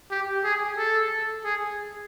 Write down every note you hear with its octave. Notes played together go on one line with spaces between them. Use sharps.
G4
G#4
A4
G#4